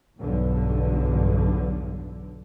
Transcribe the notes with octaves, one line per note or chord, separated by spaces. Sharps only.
B1 E2 G2 D3